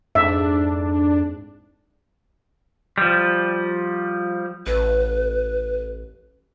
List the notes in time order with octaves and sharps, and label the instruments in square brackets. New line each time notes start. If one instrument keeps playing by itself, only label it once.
[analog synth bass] F2 [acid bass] G#2 [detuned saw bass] D4 [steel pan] E5
[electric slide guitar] F3 G3
[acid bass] A1 [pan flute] B4